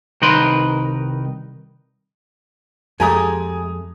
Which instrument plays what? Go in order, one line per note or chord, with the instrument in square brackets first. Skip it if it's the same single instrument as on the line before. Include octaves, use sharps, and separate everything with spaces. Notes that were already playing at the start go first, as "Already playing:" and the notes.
[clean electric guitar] C2 D#3 D#4 A#4 B4 C6
[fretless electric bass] F2 [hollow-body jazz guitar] G#3 A3 G4 [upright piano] G#5 A#5 D#6